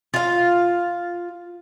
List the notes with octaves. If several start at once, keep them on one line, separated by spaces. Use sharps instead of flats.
F4 F5